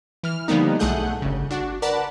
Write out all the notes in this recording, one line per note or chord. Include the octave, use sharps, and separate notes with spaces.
E3 F6
D3 F3 G3 A#3 B3 D#4
B1 A2 A3 G#4 F#5 G6
G1 C#3
D4 F#4
A#4 B4 D5 F#5 A5 B5